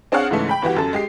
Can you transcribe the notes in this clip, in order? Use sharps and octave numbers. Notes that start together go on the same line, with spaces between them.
C4 D4 G#4 C#5 F5 F#5
G#2 C#3 E3 G#3 A3
G5 B5 B6
G1 E3 F#4 G4
F#2 A4
G#3 G4 C7